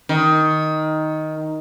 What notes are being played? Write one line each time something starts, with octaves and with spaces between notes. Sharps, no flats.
D#3